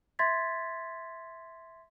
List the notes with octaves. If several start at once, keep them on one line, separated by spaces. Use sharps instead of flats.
E5 C6 G#6 A6 B6